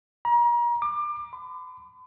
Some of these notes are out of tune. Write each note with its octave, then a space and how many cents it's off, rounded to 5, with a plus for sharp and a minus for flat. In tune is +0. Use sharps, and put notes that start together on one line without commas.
A#5 +35
D6 +25
B5 +45